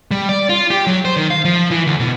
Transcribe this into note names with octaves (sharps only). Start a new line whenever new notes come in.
G3
D5
F4
G4
F#3
C5
D#3
F5
F3
E3
D2
B2